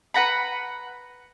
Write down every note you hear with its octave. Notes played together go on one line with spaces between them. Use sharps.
B4 F#5 A#5 B5